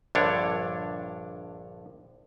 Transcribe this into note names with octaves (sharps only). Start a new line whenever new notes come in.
A#1 G2 D3 D4 C#5